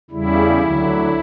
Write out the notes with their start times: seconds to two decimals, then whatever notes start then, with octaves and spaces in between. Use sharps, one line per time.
0.11 E2 C#3 G3 E4
0.61 D2 D3 F#3